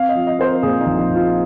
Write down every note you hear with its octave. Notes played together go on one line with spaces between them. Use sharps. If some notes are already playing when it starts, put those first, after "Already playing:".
Already playing: C4 F5
D#5
F3
D#5
C4 C5
A#4
A#2 G#4
D#4
A#1
D#4
A#2
F4